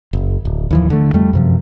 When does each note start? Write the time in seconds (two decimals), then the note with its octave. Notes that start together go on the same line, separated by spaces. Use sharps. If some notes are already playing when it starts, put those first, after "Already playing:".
0.13 F#1
0.45 D1
0.71 D#2 E3 F3
0.90 D3 A3
1.13 F2 G3 A3
1.33 F#2 C3 F3